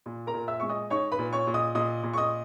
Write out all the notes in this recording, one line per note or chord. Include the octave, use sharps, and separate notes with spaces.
A#2
A#4 A#5
A#2
E5 E6
G#3 C#6
D#5 D#6
D#4 C#5 C#6
B4 B5
A#2
C#5 C#6
A#2
D#5 D#6
A#2 D#5 D#6
A#2
C#6
D#5 D#6